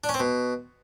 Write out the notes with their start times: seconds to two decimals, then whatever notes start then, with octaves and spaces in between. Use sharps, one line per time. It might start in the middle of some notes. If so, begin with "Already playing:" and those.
0.04 D4
0.09 C#4
0.14 C4
0.20 B2